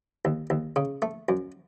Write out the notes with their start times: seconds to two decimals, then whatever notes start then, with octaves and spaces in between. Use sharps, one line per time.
0.25 D#2
0.50 D#2
0.76 C#3
1.02 A3
1.29 F#2